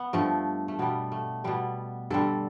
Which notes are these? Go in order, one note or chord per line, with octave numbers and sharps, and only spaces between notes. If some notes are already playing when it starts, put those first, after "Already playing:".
Already playing: B3
G2 F3 A3
A3
B2 G3 B3
A3
B2 G3 B3
G2 D3 G3 A4